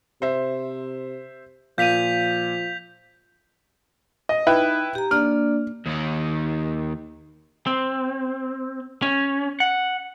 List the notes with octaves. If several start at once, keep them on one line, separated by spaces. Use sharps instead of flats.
C3 C5 E5
A#2 F3 F5 G6 B6 D#7 F7
D#5
D#4 E4 B4 G5
G4 A#5
A#3 D4 D5 F6
D#2 D#3
C4
C#4
F#5